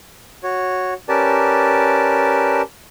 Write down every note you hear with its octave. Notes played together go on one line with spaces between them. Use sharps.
F#4 C#5
C#4 G4 A#4 B4 D5 A5